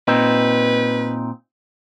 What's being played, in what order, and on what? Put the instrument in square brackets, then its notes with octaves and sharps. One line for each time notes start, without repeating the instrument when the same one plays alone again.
[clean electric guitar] A#2 C4 D#4 [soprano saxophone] B4